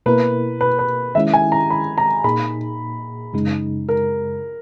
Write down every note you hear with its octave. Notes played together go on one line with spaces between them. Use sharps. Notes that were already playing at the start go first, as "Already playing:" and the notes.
B2 A#3 E4 A#4 B4
B4
B4
D#3 G#3 C#4 E4 E5
G#5
A#5
B5
A#5
A#2 A#3 D#4 G#4 B5
F#2 C#3 G#3 D#4
A#4